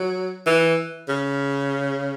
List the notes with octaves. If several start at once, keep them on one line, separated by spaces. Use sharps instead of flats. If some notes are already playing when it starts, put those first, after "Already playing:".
Already playing: F#3
E3
C#3